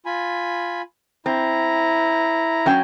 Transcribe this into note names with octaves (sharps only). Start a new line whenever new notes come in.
F4 G#5 B5
C4 E4 A#5
F#3 C#4 G5